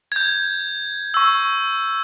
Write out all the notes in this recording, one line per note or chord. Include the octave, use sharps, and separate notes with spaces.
G6 G#6
C#6 E6